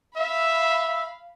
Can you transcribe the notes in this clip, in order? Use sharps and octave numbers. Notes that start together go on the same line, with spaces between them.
E5 F5 B5